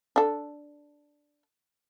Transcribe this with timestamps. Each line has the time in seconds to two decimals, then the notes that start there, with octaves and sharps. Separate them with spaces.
0.16 D4 A4